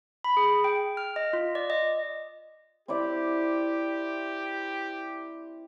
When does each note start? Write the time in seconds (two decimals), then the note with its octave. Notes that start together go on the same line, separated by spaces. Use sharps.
0.24 B5
0.37 G#4
0.64 G5
0.97 F6
1.16 D#5
1.33 F4
1.55 D5
1.70 D#5
2.88 C4 E4 G4 D5